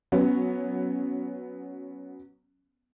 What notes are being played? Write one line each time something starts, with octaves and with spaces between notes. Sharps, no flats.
F#3 B3 C#4